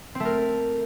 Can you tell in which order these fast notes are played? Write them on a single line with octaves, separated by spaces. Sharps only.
C4 A3 A#4